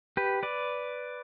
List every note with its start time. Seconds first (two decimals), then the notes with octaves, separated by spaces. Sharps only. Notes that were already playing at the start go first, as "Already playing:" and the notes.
0.17 G4 B4
0.43 B4 D5